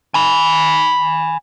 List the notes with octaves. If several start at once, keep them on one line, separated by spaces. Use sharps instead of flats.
G#5 B5